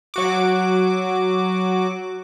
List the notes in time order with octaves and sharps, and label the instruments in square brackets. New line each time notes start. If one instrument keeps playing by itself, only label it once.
[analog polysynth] F#3 F#4 D6